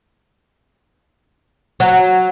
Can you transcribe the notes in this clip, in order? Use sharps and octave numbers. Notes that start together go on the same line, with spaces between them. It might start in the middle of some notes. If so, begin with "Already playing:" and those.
F#3